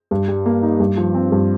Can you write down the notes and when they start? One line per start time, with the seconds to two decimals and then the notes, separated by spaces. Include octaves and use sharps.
0.11 G2
0.28 G3
0.46 A#3
0.63 D#4
0.80 G2
0.97 F3
1.14 C4
1.32 G2